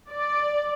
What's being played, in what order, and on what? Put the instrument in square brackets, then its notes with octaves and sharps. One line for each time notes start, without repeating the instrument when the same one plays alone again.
[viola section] D5